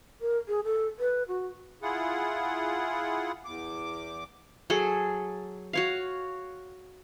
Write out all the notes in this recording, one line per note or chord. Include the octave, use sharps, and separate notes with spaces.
A#4
G#4
A4
B4
F#4
E4 F4 G#4 F#5
E2 D6
F#3 G#4 A4
F#4 C#5 F5